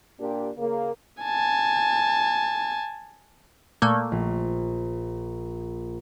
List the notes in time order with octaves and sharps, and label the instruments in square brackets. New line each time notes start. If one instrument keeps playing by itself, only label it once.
[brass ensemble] A#2 D4 G4
C#3 A#3
[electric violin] G#5 A5
[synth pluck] A#2 A3 A#3
[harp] A#1